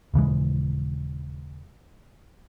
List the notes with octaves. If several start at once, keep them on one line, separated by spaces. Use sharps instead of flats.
D#1 C#3 E3 G#3